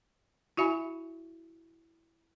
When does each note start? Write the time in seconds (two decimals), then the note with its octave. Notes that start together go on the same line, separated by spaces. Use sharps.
0.57 E4 F#4 E5 G#5 B5